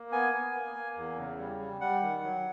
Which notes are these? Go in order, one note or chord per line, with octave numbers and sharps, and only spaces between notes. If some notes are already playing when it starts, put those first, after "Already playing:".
Already playing: A#3
B3 G#5
B3
A#3
A#3
E2
C#3
G3
G3
G3 F#5
D#3
F#3